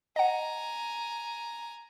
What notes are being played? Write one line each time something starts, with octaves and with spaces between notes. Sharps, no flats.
D#5 F#5 G#5 A#5